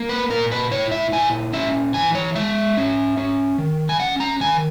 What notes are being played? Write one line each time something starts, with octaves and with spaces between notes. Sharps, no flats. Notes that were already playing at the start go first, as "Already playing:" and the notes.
Already playing: A#3
B4
A#2 A#4
B4
E4 C#5
E5
A#2 G#5
C#4 E5
E3 G#5
C#5
G#3 E5
C#4
C#4
D#3
G#5
C#4 F#5
A#5
D#3 G#5